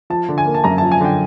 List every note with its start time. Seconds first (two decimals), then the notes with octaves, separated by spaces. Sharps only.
0.10 F3 A5
0.29 D3
0.38 G#5
0.46 A#3
0.54 A5
0.64 F#2 A#5
0.78 F3 A5
0.92 G#5
1.00 D3 G5